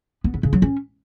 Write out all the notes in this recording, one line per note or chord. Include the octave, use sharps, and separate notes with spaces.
B3
D3
C#3
F#3
C#4